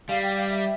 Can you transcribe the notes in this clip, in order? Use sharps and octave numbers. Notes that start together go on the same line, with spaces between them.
G3 F5
G5
F5
E5